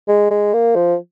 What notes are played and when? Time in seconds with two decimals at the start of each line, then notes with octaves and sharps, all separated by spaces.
0.08 G#3
0.31 G#3
0.53 A#3
0.75 F3